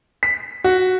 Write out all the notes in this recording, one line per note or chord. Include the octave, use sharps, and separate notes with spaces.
B6
F#4